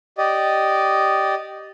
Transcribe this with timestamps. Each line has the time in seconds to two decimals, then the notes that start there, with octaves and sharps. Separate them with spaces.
0.18 G4 D5 D#5